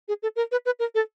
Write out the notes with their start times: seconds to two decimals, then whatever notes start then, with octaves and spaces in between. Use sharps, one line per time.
0.08 G#4
0.23 A4
0.36 A#4
0.52 B4
0.66 B4
0.79 A#4
0.95 A4